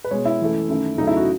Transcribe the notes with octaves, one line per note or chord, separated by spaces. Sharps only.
B4
B2 G#3 C#5
E4
F#2 E3 A3
F#2 D#3 A3
E2 C#3 F#3 A3 D#4
E4
F#4